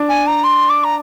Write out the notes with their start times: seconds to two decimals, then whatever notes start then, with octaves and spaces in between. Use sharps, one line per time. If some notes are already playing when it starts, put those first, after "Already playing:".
Already playing: D4
0.09 G#5
0.27 A#5
0.44 C6
0.69 D6
0.84 A#5